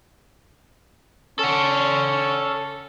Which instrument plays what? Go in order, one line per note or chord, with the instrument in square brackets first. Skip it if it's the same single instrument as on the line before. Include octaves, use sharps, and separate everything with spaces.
[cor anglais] C#4 [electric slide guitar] A4 F#5